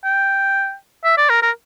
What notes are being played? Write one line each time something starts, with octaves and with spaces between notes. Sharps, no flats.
G5
E5
D5
A#4
A#4